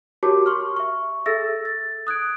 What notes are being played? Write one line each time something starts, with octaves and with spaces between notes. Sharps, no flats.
F#4 G4 A#4 C#5 A5 D6
C6 C#6 F6
E5 C#6
G#4 A4 E5 E6 A6 A#6
A6
D#6 F#6 G#6 D7